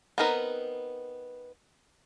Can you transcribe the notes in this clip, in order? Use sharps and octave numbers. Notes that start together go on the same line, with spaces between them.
B3 C4 D#4 A#4 B4